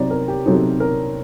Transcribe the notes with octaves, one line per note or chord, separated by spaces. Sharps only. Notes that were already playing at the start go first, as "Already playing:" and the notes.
Already playing: C3 F#3 C4 D#4 D5 A#5
A#4
G4
C3 F#3 C4 D#4 A4
A#4